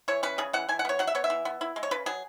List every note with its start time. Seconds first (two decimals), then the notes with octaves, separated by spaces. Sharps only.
0.08 E3 C#5
0.23 C#4 B4
0.38 C#3 G#4
0.53 E3 F#5
0.69 E3 G#5
0.79 F#5
0.85 B3 C#5
0.99 F#3 F#5
1.07 E5
1.15 B3 C#5
1.24 E5
1.30 E3
1.45 B3
1.61 E4
1.76 G#3
1.83 C#5
1.91 C#3 B4
2.06 F#3 G#4